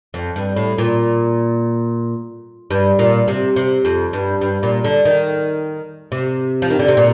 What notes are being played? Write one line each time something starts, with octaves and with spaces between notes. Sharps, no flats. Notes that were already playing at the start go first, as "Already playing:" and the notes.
F2
G2
A2
A#2
G2
A#2
C3
C3
F2
G2
G2
A#2
D3
D#3
C3
F3
D#3
D3
C3
A#2